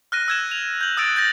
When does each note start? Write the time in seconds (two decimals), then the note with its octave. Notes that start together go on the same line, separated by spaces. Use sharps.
0.12 F6 F#6 A#6 D#7
0.28 E6 G#6 E7
0.51 F7
0.81 G6 F#7
0.97 D#6 E6 F#6 A6 D7
1.16 G6 A6 A#6